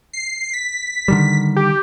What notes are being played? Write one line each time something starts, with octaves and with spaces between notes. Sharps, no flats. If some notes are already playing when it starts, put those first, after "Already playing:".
C7
B6
D3 D#3 G3
G4